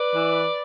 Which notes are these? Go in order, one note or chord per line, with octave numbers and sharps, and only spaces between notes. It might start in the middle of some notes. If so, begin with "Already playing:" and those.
Already playing: B4 D5
E3